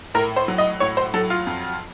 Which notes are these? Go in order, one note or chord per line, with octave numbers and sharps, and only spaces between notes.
A2 A#4
C5
F#3
D#5
A2 C#5
C5
F#3 A4
F4
F2